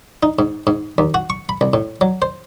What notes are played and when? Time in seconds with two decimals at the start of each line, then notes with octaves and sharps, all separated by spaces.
0.23 D#4
0.39 G#2
0.67 G#2
0.98 D#2
1.14 F#4
1.30 C#6
1.49 B5
1.61 C2
1.73 A2
2.01 F#3
2.22 C5